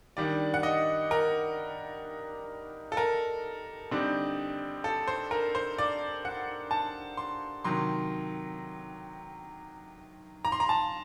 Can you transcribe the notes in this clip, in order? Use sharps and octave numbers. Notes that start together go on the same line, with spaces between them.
D#3 G3 D4 D5
F#5
D#5
A#4
A4
A#4
D3 G3 C4 D#4
A4
C5
A#4
C5
D5
F#5
A5
C6
C3 D#3 F#3 C6
A#5
C6
A#5
A5